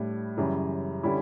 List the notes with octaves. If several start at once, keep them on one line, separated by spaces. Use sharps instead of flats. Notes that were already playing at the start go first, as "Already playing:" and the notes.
Already playing: A2 G3 D4
F#2 C#3 E3 G3
D3 G3 C#4 E4